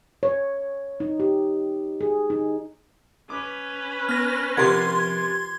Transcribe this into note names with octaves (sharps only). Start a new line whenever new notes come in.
C#5
D#4
G4
G#4
D#4
C#4 B4 D6
B3 F6 A#6
C3 F3 G4 A#4 F#5 C6 G#6 A6